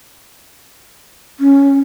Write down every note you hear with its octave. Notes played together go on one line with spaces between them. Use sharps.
C#4